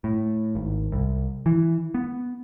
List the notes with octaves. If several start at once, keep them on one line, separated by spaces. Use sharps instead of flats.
A2
G#1
C2
E3
B3